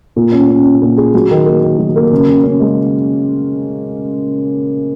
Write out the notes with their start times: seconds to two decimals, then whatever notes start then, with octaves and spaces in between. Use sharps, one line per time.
0.16 A#2
0.32 C#4
0.49 C#4
0.64 C#4
0.82 A#2
0.97 G#4
1.14 F#3
1.31 D#3
1.46 A#3
1.63 D#3
1.79 F#3
1.96 A#3
2.11 C#3
2.28 C#3
2.44 C#4
2.60 G#3